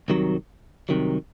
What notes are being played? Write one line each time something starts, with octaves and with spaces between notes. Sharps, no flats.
C2 C3 D#3 F#3
C2 C3 D#3 F#3